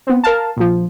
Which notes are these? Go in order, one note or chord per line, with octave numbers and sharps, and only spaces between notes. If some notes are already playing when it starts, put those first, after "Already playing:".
B3 C4
A#4 F5 A5
A#1 F3